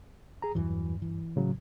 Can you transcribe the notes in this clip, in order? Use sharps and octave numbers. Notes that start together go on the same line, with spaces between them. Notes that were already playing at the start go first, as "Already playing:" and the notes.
G#4 A#5
E2 G2 E3 F#3
E3
A2 C#3 F#3